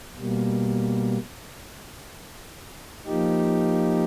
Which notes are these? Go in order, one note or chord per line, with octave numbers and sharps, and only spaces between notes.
B2 G3 A#3
F3 A#3 D#4 G4